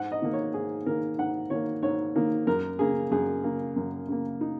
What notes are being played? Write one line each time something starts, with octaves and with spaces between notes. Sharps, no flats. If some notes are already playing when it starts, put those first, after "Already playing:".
Already playing: G#2 F#5
D#5
D#3 A#3
C#5
G#2 G#4
D#3 A#3 A#4
G#2 F#5
D#3 A#3 C#5
G#2 C#5
D#3 A#3
F#2 A#4
C#3 A#3 G#4
F#2 G#4
C#3 A#3
F#2
C#3 A#3
D#4